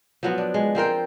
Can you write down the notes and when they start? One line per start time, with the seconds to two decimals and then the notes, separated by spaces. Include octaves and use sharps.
0.23 F3 F#3 B3
0.38 D4
0.54 G#3
0.75 F3 C4 A#4 G5